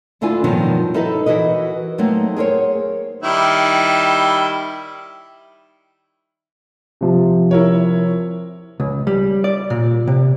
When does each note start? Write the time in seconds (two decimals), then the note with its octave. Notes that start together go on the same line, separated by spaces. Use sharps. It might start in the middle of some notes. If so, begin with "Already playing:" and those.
0.21 D2 D3 D4 E4 F4 G#5
0.44 G2 B2 D#3 F3 F#3
0.94 D#4 E4 A4 B4 D#5
1.26 E3 F#4 A#4 B4 D#5
1.98 F#3 A3 A#3 C4 D#4
2.37 G#4 A#4 C5 C#5
3.23 D#3 G3 E4
7.01 C3 F3
7.51 E4 A#4 C#5
8.80 C#2
9.07 G3
9.44 D5
9.70 A#2
10.07 C3